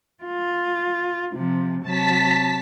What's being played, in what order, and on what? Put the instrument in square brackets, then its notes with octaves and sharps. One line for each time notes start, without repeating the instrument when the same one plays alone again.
[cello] F4
C3 F3
[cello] C3 F#3 [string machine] A5 B6